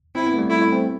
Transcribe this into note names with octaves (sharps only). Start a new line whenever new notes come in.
C4 E4
B3
A3
G3
A3 E4
A3
C4